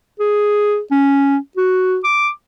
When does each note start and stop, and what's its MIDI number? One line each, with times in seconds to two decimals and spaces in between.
0.20 0.80 68
0.91 1.37 61
1.57 1.99 66
2.04 2.29 86